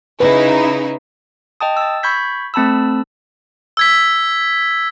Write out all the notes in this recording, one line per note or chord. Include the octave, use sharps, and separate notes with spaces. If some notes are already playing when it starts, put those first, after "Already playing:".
C#3 D#4 E4 B4
D#5 G5 A5 D#6
E6 A6
B5 C#6 G6 G#6 B6
A3 C4 A5 B5 E6
E6 G#6 B6